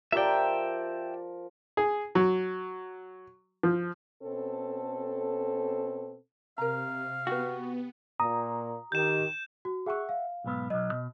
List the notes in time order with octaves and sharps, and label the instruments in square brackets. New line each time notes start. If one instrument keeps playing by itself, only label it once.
[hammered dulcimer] F3 A#4 [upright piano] F4 G4 D5 [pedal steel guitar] E5 G5
[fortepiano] G#4
F#3
F3
[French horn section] B2 C4 C#4 A4
[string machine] C3 [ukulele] A#4 A#5 [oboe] F5
[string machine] B3 [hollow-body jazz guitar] F#4 [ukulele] G4 B4
[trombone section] A#2 [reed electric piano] A#5 D#6
[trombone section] D#3 [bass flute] G4 [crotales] G6 E7
[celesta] F#4
[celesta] G#4 C#6 [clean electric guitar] E5 F#5
[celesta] F5
[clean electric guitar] B1 G#2 B3
[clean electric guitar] B1 F#3 [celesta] D#5
[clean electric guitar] B2